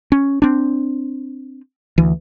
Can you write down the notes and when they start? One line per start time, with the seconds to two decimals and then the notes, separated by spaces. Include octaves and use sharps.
0.12 C#4
0.42 C4 D4
1.98 D2 E3